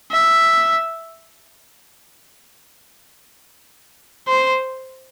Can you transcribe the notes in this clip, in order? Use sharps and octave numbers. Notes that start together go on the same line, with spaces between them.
E5
C5